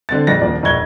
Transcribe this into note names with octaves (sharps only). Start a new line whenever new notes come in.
D3 C4 A6
A#1 F2 G#3 A6 A#6
D#1 A#1 F3 D5
E1 A#1 G#2 C#6 G#6 G7